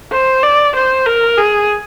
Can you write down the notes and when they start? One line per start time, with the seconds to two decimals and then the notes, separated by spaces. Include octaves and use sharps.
0.12 C5
0.43 D5
0.75 C5
1.06 A#4
1.37 G#4